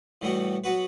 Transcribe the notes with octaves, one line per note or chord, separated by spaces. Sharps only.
A2 E3 G3 B3 F#4
F#3 B3 F#4 B4